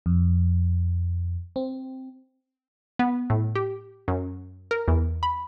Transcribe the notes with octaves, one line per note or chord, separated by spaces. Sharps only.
F2
C4
B3
A2
G4
F#2
A#4
E2
B5